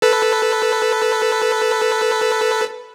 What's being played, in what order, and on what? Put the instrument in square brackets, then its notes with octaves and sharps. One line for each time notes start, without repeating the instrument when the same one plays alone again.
[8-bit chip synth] A4 B4